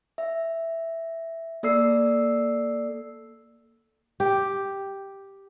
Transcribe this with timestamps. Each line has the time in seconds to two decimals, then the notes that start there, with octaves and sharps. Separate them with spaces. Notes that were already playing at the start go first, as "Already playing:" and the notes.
0.18 E5
1.63 A#3 A4 D5 E6 C7
4.20 G4